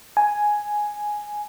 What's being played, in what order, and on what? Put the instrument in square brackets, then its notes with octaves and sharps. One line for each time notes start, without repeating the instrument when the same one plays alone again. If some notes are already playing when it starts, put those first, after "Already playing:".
[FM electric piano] G#5